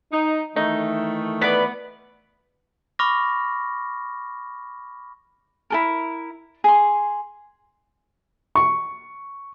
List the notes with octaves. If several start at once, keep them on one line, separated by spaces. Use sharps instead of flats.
D#4
D#3 E3 A3 D#4
B3 B4 D5
B5 C#6 D6 F6 A#6
E4 A4 A#4
G#4 C6
C#6